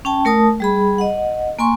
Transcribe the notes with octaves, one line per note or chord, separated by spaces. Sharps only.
C#4 G5 A5
A3 A#4 A5 D#6
G3 G#4 B5
D#5 F#5
A#3 G#5 C6 C#6